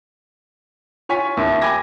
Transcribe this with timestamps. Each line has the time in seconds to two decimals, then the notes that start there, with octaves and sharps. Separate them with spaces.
1.09 F4 C#5 G#5 C#6 B6
1.37 D#2 E5
1.62 G5 G#5 B5 D6 G#6 A#6